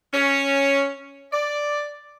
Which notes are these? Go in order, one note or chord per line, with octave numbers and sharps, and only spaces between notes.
C#4
D5